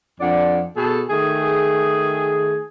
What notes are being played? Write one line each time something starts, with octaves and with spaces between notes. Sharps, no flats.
F2 D4 D5 F#5
B2 G#4 A4
D#3 A3 G#4